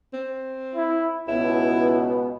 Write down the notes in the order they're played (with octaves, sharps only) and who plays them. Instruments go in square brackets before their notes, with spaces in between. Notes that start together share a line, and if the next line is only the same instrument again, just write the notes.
[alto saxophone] C4
[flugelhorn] E4
[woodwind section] C#2 B2 [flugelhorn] B3 [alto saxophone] E4